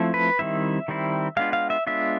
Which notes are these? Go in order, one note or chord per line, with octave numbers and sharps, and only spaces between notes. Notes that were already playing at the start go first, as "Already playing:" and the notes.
Already playing: F3 A3 C4 E4
B4
D#3 G3 C4 E4 E5
D#3 G3 C4 E4
G#3 B3 D4 F4 F5
F5
E5
G#3 B3 D4 F4 E5